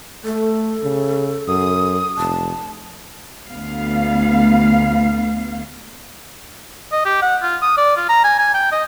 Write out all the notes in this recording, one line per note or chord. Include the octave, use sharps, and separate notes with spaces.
A3 A4
C#3
F#2 D#6
F1 A5
D2 B3 F5
D#5
G4
F#5
F4
D#6
D5
F4
A#5
G#5
G#5
G5
D#5